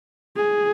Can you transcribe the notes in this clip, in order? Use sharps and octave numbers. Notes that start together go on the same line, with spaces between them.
G#4